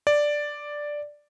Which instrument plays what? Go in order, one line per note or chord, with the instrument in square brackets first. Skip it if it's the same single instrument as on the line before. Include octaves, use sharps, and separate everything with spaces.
[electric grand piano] D5